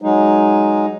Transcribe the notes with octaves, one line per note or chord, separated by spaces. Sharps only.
F#3 G#3 D#4